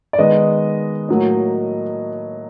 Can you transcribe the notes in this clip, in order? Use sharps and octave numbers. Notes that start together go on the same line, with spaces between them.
D5
D#3 G#3 B3 D#5
A2 F#3 A#3